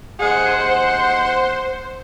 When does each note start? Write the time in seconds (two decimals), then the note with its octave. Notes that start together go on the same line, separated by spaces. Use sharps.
0.20 D#2 G#3 G#4 C5 F#5
0.62 C6